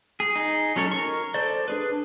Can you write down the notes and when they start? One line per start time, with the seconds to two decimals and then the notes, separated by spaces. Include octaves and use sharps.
0.20 G#4
0.36 D#4 G#4
0.76 F#3 C#4 A4 C#5
0.91 A#4 C#6
1.34 A4 C5 D5
1.68 D4 G#4 B4